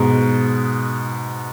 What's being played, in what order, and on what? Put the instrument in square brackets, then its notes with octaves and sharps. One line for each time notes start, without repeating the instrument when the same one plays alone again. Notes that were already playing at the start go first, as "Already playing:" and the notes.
Already playing: [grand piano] G#2 B2